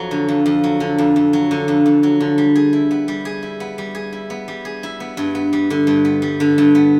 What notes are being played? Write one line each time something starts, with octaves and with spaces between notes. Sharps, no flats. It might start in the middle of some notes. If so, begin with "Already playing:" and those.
Already playing: F2 F#3
D3
F2
F2
F#3
D3
F2
F2
F#3
D3
F2
F2
F#3
D3
G3
G#4
E4
B3
G3
G#4
E4
B3
G3
G#4
E4
B3
G3
G#4
E4
B3
G2
B3
G3
D3
G2
B3
G3
D3
G2
B3